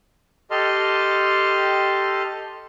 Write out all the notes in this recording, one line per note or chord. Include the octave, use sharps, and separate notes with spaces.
G4 A4 D#5 A5 C6 F6